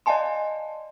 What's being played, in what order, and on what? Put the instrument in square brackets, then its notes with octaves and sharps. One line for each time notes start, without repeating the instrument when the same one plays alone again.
[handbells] D5 D#5 F5 G#5 A5 C6